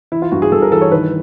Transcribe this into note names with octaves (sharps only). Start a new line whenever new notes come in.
E3 E4
F4
G2 F#4
G#4
G2 A4
A#4
E3 A4
C#5
D#3 B4